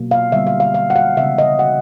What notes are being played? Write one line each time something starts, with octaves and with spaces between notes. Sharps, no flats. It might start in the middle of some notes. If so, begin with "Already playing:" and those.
Already playing: B2 F#3 A#3
F5
D3 G3 B3 E5
F5
F5
F5
F#5
F5
C#3 E3 G#3 B3 E5
D#5
F#5